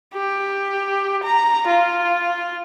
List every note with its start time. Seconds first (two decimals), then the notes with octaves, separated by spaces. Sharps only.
0.14 G4
1.23 A#5
1.67 F4